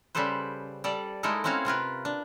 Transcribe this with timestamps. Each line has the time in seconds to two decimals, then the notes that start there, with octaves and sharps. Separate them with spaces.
0.15 C#3 G3 G4 A4 B4 C5
0.84 G3 A4 D5
1.23 G#3 A3 D#4 E4 A4 A#4
1.44 C4 C#4 E4 F#4 C#5 F5
1.65 C3 F4 A#4 B4
2.05 D4